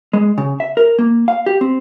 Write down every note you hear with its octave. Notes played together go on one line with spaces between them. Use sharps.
G#3
C#3
E5
A#4
A#3
F5
G4
C4